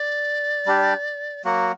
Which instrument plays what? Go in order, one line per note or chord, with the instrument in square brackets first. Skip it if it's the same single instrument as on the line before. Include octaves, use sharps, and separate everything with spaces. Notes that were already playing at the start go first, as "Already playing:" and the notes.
Already playing: [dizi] D5
[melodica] G3 D4 G4
[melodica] F#3 A#3 F#4 [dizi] F#5